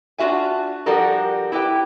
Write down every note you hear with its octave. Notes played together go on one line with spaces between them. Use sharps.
D4 F4 F#4 E5 G#5
F3 G3 D4 F#4 A4 A#4
E4 G4 B4 G5